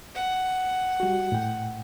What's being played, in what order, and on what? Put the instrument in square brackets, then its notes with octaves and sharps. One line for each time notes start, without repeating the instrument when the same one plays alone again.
[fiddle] F#5
[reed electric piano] G3 F#4
A2 G5